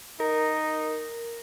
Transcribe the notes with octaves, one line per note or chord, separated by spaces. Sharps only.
D#4 A#4
A#4